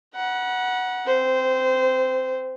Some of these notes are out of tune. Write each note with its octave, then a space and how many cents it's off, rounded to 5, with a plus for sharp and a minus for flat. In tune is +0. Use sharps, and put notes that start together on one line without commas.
F#5 +0 B5 -45
C4 +0 C5 -20